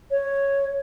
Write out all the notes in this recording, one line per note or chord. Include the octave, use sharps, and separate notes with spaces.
C#5